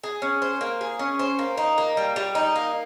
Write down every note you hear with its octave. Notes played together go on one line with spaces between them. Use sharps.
G#4
C#4
C5
A#3
G#4
C#4
C5
A#3
D#4
A#3
G3
G3
D#4
A#3